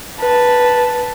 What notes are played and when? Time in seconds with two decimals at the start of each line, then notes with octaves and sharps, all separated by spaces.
0.19 B4 A5